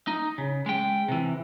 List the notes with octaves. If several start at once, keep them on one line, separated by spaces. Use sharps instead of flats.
D#4
C#3
G#3 G5
C3 E3